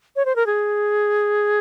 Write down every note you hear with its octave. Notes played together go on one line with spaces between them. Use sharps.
C#5
C5
A#4
G#4